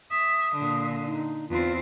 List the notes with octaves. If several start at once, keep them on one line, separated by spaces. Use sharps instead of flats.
E5 D#6
A#2 D3
D#4
E2 C4 F4